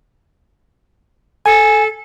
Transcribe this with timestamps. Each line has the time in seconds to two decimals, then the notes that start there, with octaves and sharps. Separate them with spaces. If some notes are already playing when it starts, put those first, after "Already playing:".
1.46 A4 G#5